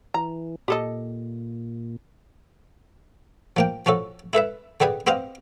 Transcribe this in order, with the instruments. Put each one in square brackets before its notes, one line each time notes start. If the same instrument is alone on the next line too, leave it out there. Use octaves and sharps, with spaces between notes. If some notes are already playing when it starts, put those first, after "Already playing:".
[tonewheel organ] E3 [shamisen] A#5
[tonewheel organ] A#2 [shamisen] G4 A4 D#5
[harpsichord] F3 A#3 G5
F3 C#4 F#4 A4
E4 A4 B4 E5
D3 G4 G#4 B4 G#5
B3 C4 G4 C5 D#5 F5